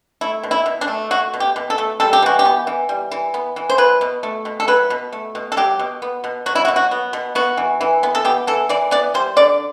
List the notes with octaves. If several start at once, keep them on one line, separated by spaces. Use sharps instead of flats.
A3 E4
B2
E4
B2
D4
A3
A3 F#4
B2
G4
B2
A4
A3
G3 A4
G4
E3 F#4
G4
B3
E3
G3
E3
B3
E3
C5
F#3 B4
B2
A3
B2
A4
F#3 B4
B2
A3
B2
A4
F#3 G4
B2
B3
B2
F#3 F#4
E4
F#4
B2
F#4
B3
B2
B3 F#4
E3
E3
B3
A4
B3 G4
E3 A4
E3 D5
B3 D5
G3 C5
D3 D5